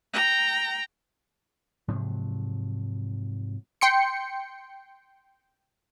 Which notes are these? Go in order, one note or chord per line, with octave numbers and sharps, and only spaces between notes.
G5 A#5
G#2 C3 F3 F#3
G5 C6 C#7